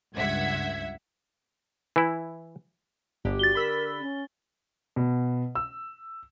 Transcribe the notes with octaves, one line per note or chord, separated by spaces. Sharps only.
C#2 G2 E5 F#5 G#6 B6
E3 E4
G1 D3 G4
F#4 A6 G7
A#4 B5 E6 B6
C#4
B2
E6